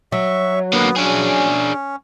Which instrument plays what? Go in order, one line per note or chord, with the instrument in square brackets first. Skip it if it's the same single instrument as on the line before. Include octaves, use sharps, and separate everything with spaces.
[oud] F#3 [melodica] E5 C#6
[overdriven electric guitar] D3 A#3 [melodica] B3
[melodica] C#4 [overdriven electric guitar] D4 G#4